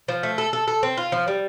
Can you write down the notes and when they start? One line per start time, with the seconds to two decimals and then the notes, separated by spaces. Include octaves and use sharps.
0.08 F3
0.23 A3
0.38 A4
0.53 A4
0.68 A4
0.83 C4
0.97 F4
1.12 F3
1.28 G3